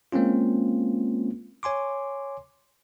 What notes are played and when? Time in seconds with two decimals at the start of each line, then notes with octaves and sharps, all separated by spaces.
0.12 G#3 A#3 C4 C#4 F4
1.63 C#5 G#5 C6 D6